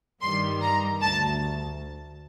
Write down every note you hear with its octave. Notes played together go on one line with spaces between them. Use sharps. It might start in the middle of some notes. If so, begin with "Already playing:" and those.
G2 D#3 G3 C6
A#5
D2 A5